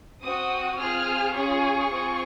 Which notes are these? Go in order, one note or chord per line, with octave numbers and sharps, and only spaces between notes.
C4 F#4 D#6
C4 F4 G#4 F6
C#4 F4 G#4 C#6
C4 F4 G#4